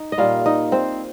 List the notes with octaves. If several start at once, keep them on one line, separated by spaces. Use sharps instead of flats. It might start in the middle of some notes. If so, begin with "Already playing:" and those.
Already playing: D#4
D#5
A#2 G3 A#3 F4 F5
D#4 D#5
C4 C5